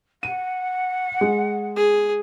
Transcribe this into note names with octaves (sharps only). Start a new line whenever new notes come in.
F#5 D#7
G#3
G#4